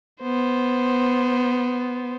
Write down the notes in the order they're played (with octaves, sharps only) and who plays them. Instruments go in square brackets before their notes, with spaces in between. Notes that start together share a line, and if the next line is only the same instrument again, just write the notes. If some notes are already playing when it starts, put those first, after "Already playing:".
[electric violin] B3 C5